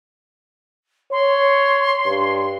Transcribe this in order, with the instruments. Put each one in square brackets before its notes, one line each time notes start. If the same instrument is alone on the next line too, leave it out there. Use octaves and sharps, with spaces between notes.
[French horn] C#5 [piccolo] C6
[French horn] G2